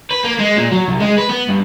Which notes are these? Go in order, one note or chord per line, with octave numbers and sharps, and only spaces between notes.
B4
A#3
G#3
A#2
F#3
C2
G#3
B4
B3
G2